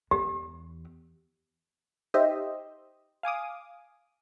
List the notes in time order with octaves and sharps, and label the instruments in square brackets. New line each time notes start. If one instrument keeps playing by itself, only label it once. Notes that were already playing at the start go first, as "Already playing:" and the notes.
[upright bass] E2 [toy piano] G4
[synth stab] D#4 G4 C5 D#5 E5
F5 G#5 D6 D#6